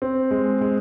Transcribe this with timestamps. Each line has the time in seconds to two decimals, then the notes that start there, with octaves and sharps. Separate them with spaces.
0.02 C4
0.31 G#3
0.61 G#3